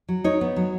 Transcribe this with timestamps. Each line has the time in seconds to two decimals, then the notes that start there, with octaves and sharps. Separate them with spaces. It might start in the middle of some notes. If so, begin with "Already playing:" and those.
0.08 F#3
0.24 D#4 C#5
0.41 B3
0.56 F#3